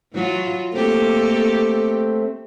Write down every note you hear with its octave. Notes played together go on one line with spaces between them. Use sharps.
E3 F#3 F4
A3 A#3 C4 G4 A4